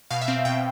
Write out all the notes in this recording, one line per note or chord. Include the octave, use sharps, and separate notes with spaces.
B2 F5
E5
C4 F5
B2 G5